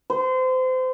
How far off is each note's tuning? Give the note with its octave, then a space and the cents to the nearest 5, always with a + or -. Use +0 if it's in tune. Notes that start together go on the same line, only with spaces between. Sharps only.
C5 -30